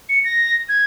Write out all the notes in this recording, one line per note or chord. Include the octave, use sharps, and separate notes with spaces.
C#7
A#6
G#6